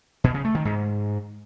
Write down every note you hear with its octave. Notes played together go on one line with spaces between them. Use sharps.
B2
C#3
A3
D#3
G#2